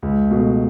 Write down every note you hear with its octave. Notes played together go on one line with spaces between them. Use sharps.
C#2
B2 A3